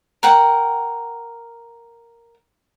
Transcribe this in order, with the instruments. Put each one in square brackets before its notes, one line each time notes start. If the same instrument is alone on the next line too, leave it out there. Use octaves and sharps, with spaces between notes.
[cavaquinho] A#4 F#5 G5